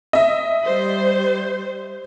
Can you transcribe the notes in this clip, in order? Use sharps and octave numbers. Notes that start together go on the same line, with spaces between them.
D#5 E5
G3 C5